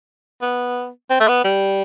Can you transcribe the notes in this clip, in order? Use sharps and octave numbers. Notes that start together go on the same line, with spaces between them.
B3
C4
A3
B3
G3